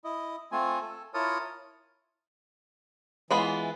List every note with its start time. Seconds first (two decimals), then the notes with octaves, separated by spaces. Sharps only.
0.04 E4 D#5
0.52 A3 C4 F4 G#5
0.81 A4
1.14 E4 F4 A#4 C#5 A5 D#6
3.31 E3 G#3 B3 F4